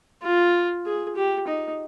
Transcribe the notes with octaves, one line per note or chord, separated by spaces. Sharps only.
F4
G#4
G4
D#4